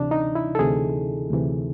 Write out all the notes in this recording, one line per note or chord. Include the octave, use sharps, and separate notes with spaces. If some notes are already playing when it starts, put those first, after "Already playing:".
Already playing: D2 C3 E3 D4
D#4
E4
A4
D2 C3 E3 G#4
D2 C3 E3